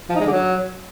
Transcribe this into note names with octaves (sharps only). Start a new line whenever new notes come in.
F3
D#4
G#3
D3
F#3